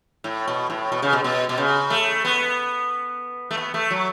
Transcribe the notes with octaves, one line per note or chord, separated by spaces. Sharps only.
A2
B2
A2
B2
C#3
B2
B2
B2
C#3
A3
B3
A3
B3
A3
F#3